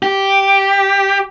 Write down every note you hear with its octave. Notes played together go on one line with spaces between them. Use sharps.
G4